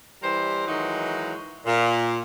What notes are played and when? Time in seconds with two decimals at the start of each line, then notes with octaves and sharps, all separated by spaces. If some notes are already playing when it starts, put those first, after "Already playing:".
0.22 E3 G3 A#4 C5
0.68 D#3 E3 F#3 G#3 D#4
1.66 A#2